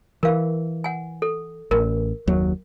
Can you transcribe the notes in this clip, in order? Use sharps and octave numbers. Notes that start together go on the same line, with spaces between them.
E3 A#4 F5
F#5 G#5
A4
A1 A#4
F#1 D#2 F#3